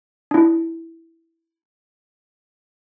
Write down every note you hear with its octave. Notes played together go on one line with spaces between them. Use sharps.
D4 E4